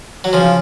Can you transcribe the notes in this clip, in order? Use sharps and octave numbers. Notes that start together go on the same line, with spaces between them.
F#3
C#3 F3